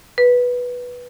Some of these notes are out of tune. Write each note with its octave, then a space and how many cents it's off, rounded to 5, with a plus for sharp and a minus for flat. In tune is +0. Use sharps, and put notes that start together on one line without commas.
B4 -10